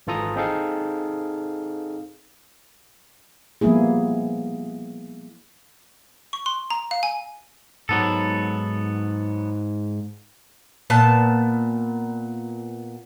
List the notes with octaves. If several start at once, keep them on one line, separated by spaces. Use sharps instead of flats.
G#1 E3 F4 A4 A#5 D#6
C4 D#4 G#4 A4 F5
F3 G3 A#3 B3 E4 G#4
C#6
C6
A#5
F5
G#5
G#2 F#3 B3 A4
A#2 B3 A5